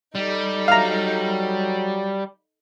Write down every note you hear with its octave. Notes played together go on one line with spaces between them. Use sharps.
G3 D#4 A4
F#3 F5 A#5